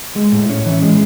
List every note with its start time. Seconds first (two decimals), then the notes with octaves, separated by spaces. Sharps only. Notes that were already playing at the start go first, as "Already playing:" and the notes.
0.16 G#3
0.32 A2
0.49 C#4
0.66 E3
0.82 G#3